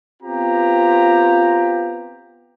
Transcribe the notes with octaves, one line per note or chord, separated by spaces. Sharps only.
B3 C4 F4 G4 A#5